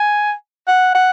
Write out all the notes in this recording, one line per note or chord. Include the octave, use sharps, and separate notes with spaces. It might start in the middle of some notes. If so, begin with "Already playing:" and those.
Already playing: G#5
F#5
F#5